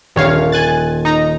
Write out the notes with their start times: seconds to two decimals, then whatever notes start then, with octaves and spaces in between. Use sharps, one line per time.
0.16 D#1 G2 C#5 F5
0.52 G#5 F#6 A6
1.05 D#4 A#5